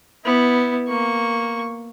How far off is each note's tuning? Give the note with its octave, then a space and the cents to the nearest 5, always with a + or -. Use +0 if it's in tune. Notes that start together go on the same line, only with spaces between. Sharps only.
B3 +0 E4 -15
A#3 +0 C#6 +0